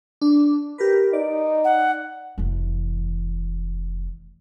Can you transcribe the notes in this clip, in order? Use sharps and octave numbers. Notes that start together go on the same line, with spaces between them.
D4
G4 A#4 B4
D#4 D5
F#5
F1 E3